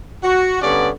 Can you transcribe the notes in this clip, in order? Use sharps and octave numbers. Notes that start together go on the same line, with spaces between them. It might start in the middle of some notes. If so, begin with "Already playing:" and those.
F#4
G2 D3 B3 C#4 D5